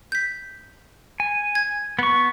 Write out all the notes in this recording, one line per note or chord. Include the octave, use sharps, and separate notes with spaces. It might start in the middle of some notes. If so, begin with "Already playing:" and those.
G6 B6
G#5
G#6
B3 C#6